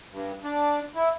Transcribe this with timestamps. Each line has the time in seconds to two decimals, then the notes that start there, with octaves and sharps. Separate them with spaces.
0.12 G2
0.44 D4
0.96 E4